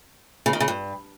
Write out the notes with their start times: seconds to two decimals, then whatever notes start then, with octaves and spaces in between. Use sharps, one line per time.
0.46 C#3
0.53 D#3
0.60 C#3
0.68 G2